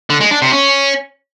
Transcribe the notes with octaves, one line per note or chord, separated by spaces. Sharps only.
D3
G#3
D4
C3
C#4